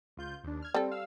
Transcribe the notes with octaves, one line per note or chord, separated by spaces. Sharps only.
C#2 F4 G6
D#2 D4
F6 G#6
G3 C4 A4
F5 E6